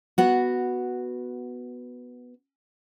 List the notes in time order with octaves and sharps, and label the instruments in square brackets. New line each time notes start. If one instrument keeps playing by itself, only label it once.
[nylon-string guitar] B3 F#4